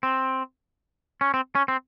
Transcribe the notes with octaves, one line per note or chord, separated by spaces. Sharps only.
C4
C#4
C4
C#4
C4